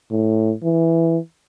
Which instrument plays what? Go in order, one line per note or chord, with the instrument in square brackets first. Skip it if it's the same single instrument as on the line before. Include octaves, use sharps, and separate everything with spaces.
[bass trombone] A2
E3